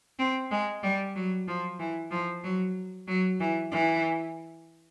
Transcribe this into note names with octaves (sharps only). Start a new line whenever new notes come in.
C4
G#3
G3
F#3
F3
E3
F3
F#3
F#3
E3
E3